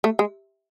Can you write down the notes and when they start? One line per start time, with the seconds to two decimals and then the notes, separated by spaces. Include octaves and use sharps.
0.04 A3
0.19 G#3